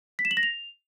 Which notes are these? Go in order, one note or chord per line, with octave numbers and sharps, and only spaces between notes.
B6
E7
F#7
A#6
F7